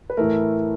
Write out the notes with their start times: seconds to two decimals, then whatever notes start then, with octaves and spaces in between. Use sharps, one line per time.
0.10 B4
0.17 A2 E3 A3 A#4